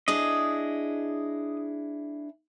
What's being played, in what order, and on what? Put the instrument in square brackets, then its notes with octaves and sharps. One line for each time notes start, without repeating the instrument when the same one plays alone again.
[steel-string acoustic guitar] D4 E4 G#4 [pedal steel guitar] D#5